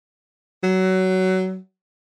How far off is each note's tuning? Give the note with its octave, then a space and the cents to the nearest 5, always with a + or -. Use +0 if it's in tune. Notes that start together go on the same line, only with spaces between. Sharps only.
F#3 +20